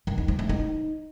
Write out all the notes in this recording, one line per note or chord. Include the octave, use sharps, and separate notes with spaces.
D#3
D#4
F3
A3
D#4